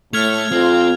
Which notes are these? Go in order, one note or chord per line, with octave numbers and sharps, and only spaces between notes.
A2 A3 F6 G#6 F7
F2 C4 F4